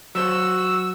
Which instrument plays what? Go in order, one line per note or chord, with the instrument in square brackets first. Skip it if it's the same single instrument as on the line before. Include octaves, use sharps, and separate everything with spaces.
[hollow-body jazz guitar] F#3 C5 [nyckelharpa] F#4 [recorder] E6